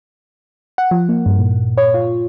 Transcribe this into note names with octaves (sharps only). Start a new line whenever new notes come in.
F#5
F3
A#3
G2
A#2
C#5
F4